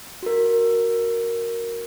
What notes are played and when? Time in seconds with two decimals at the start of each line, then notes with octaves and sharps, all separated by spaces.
0.23 F#4 A#4